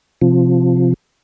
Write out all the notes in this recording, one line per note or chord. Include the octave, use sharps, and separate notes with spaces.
C3 F3